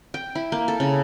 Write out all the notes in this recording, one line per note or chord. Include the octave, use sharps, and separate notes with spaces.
G5
E4
A#3
A4
C#3